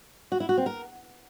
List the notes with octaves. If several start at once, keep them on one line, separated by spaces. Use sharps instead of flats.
F#4
E4
F#4
C4
A#4